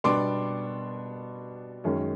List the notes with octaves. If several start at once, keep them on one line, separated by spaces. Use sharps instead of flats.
B2 G3 B3 D4 C6 D6
F#2 D#3 G#3 C#4